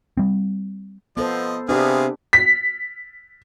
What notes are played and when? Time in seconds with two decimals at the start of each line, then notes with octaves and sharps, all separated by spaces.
0.17 G3 C4
1.17 F3 B3 A4 C5 D#5
1.69 C3 B3 D4 G4 G#4 F5
2.33 B6